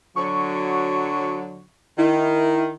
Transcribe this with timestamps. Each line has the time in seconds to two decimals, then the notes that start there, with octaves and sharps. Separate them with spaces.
0.16 D3 F#3 C#6
1.98 D#3 E4